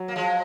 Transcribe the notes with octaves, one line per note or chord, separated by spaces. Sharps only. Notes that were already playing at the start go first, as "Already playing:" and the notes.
Already playing: F#3
A#3
F3 G#3